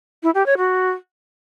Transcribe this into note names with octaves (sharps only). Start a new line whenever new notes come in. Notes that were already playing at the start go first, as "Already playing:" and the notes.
E4
G4
C#5
F#4